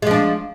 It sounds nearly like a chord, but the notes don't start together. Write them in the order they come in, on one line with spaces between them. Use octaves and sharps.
G#3 F3 D4